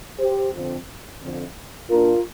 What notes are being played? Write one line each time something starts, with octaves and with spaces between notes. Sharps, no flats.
G4 C5
F2 D3 F3 C4
F2 D3 F3 C4
A#2 A#3 D4 F4 A#4